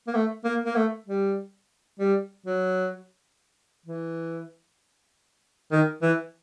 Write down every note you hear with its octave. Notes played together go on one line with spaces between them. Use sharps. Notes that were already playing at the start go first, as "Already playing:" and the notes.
A#3
A3
A#3
A#3
A3
G3
G3
F#3
E3
D#3
E3